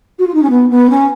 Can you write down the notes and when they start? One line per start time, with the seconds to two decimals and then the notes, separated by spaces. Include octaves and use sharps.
0.18 F#4
0.26 F4
0.34 D#4
0.42 C#4
0.50 B3
0.69 B3
0.89 C#4